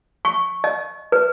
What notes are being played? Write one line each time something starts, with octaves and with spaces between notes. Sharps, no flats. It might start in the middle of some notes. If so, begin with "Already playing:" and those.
C#6
D#5
B4